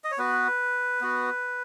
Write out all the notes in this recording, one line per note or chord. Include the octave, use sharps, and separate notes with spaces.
D#5
C#5
B3 F#4 B4
B3 F#4